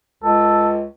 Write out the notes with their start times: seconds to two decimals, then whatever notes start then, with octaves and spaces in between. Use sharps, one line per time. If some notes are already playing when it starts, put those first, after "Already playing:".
0.23 C#2 A4